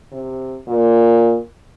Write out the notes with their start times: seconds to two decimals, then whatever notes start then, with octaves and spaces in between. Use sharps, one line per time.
0.12 C3
0.68 A#2